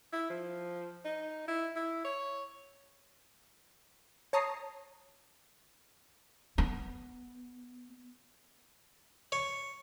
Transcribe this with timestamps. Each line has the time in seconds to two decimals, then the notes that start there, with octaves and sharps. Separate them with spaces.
0.13 E4
0.30 F3
1.05 D#4
1.48 E4
1.76 E4
2.05 C#5
4.33 C#5 A5 A#5 D#6 C7
6.58 B3
9.32 C#5